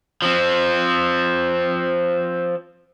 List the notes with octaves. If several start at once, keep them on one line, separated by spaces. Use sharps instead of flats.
F3 C4